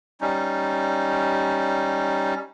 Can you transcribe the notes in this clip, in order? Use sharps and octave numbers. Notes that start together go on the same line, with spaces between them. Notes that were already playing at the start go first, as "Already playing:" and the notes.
G3 C#4 D#4